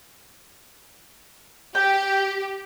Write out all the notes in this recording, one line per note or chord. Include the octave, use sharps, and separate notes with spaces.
G4 G5